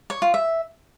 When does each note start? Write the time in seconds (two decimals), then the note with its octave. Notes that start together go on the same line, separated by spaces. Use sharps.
0.10 C#5
0.22 F4
0.34 E5